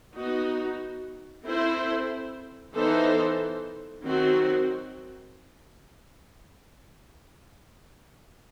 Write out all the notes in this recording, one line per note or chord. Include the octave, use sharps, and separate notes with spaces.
B3 D#4 F#4
C4 E4 A4 C5
E3 B3 D#4 A4 C5
D#3 F#3 C4 F#4